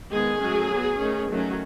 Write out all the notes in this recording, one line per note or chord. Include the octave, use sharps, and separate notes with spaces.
D#3 G#3 B3 G#4
F#3 A3 C#4
F#3 B3
D#3 A3 C#4
D#3 F#3 A3 C#4